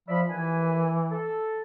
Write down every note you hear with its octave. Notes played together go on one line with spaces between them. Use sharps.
F3 D5 E5 B5
D#2 E3 B4 G#5
A4